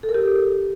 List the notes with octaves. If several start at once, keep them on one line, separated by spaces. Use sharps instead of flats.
A4
A#4
G4